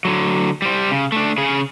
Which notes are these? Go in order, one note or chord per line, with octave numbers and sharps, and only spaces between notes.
D3 F#3
G3 C5
C#3
A3 D4
C#3 G#4